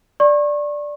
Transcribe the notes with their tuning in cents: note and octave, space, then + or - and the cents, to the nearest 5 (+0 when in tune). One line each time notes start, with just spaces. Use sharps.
D5 +0 C#6 -35